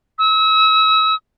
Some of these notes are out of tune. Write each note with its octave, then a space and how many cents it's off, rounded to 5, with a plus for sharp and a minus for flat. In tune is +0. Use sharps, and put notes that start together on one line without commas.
E6 -40